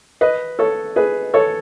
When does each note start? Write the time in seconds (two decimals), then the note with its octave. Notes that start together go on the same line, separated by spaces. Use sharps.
0.21 B4 D#5
0.59 A4 C#5
0.96 G#4 B4
1.34 A4 C#5